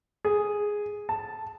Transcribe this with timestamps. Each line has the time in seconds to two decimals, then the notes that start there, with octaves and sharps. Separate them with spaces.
0.25 G#4
1.09 A5